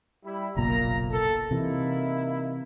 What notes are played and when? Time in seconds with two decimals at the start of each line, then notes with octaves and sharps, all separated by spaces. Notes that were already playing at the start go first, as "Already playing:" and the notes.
0.25 G3 E4
0.57 F#1 B1 A#2 A#3 A#5
1.10 A4
1.51 C3 E3 A#3 D#4 E4